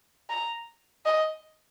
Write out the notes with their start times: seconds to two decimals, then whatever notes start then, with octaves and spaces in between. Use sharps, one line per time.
0.30 A#5
1.06 D#5